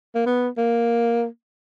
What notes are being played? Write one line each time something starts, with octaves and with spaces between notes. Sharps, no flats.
A#3
B3
A#3